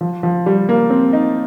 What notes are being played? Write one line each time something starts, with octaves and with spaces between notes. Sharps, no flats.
F3
F3
G3
A#3
C4
D#4